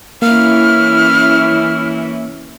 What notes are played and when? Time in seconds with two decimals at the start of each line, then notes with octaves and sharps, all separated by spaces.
0.22 E3 A#3 C#4 E4 F6